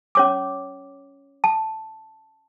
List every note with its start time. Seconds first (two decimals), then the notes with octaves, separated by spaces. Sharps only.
0.15 C#4 C#5 D6
1.44 A5